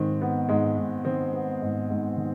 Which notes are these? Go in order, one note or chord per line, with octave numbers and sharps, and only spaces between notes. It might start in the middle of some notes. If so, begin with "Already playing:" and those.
Already playing: G#2 D#3 C4
B3
G#2 G#3
G#2
D#3 C4
B3
G#2
G#2
D#3